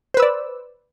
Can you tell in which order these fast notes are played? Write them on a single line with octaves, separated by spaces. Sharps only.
C5 B4 E6 D5